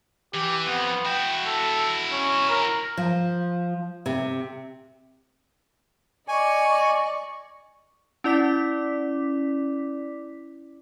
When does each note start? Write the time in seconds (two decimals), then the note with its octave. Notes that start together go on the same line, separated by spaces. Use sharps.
0.34 E3 G4
0.67 F2 B3
1.06 E4 F#4 G5
1.47 A4
2.12 C#4
2.49 A#4
2.97 F3
4.06 C3
6.28 D5 D#5 G#5 C#6
8.24 C#4 E4 D5 D6 B6